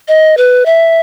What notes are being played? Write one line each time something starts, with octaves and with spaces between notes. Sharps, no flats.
D#5
B4
E5